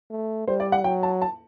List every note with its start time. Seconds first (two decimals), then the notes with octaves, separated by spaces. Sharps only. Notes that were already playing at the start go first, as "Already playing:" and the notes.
0.10 A3
0.47 G3 C5
0.60 D5
0.72 F#5
0.84 F#3 G5
1.03 A5
1.22 A5